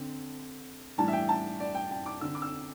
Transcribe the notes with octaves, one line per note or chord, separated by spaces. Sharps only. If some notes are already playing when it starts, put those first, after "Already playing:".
Already playing: D3 C4
A2 E3 G3 D4 A5
E5
G5
A5
D5
G5
G5
D6
D3 C4 E6
D6
E6